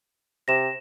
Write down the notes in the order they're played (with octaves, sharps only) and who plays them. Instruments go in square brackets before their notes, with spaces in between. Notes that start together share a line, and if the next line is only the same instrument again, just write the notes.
[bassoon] C3 [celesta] A#6 E7